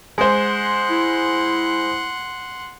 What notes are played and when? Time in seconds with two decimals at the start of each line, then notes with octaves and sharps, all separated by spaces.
0.18 G#3 C5 F#5 C6
0.90 E4